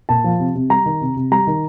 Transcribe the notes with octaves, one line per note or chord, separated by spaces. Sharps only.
A#2 A5
F3
C3
C3
G3 A#5
D#3
C3
C3
G3 A#5
D#3